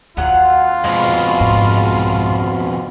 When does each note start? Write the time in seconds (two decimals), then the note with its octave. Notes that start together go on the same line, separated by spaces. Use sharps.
0.17 D#2 F#3 F4 F#5 A#5
0.84 F2 B2 G#3
1.40 C2 G#2